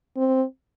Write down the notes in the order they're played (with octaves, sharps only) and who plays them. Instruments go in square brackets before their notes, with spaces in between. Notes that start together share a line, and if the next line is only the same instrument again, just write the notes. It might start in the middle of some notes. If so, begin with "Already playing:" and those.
[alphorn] C4